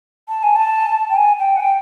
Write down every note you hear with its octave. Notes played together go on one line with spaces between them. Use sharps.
A5
G#5
A5
G5
G#5
G5
F#5
G5